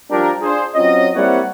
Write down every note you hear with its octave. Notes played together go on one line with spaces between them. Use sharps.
F3 G3 D4 F4 G4 A#4
D4 F4 G#4 C5
F#3 C4 C#4 F4 D#5
G3 A#3 C4 E4 C#5 F#5